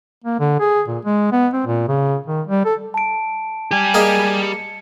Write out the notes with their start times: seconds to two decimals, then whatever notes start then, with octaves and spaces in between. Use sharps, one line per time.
0.24 A#3
0.40 D3
0.60 G#4
0.88 A#2
1.05 G#3
1.32 B3
1.53 C4
1.66 A#2
1.88 C#3
2.27 D#3
2.47 G3
2.65 A4
2.94 A5 D7
3.71 G3 G4 G#5
3.94 A#3 G#4 D#5
4.43 C#7